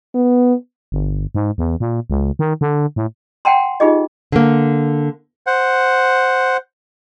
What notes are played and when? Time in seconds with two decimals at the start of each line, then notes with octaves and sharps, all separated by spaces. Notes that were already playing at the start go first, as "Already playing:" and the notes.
0.15 B3
0.92 G1
1.35 G#2
1.58 E2
1.80 A#2
2.10 C#2
2.39 D#3
2.61 D3
2.96 A2
3.45 F#5 G5 A5 A#5 C6
3.80 D#4 F4 G4 G#4 D#5
4.32 D3 A#3
5.47 C5 F#5